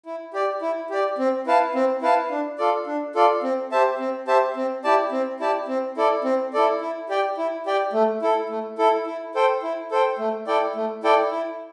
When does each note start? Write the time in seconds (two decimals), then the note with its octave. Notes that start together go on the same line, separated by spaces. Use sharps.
0.06 E4
0.34 G4 D5
0.62 E4
0.90 G4 D5
1.18 C4
1.47 E4 B4 F5 A5
1.75 C4
2.02 E4 B4 F5 A5
2.31 D4
2.58 F4 A4 D5
2.87 D4
3.15 F4 A4 D5
3.43 C4
3.72 G4 C5 E5 A5
3.99 C4
4.27 G4 C5 E5 A5
4.56 C4
4.84 E4 G4 D5 A5
5.12 C4
5.40 E4 G4 D5 A5
5.68 C4
5.97 E4 A4 D5
6.24 C4
6.53 E4 A4 D5
6.81 E4
7.09 G4 D5 G5
7.37 E4
7.66 G4 D5 G5
7.93 A3
8.22 E4 A4
8.49 A3
8.78 E4 A4
9.07 E4
9.35 A4 C5 G5
9.63 E4
9.91 A4 C5 G5
10.19 A3
10.47 E4 A4 D5 G5
10.75 A3
11.03 E4 A4 D5 G5
11.31 E4